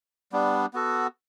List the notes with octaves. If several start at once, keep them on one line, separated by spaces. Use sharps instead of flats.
G3 B3 D4
B3 F#4 A4